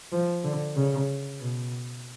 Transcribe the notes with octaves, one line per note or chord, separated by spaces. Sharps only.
F3
D3
C#3
B2